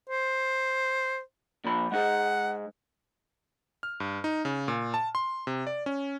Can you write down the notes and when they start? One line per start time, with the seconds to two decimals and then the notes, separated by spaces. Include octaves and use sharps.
0.09 C5
1.64 A#2 F3 B5
1.92 G#3 D#4 G#4 F#5
3.83 F6
4.00 G2
4.24 D#4
4.45 C#3
4.68 A#2
4.94 A5
5.15 C6
5.47 C3
5.67 D5
5.86 C#4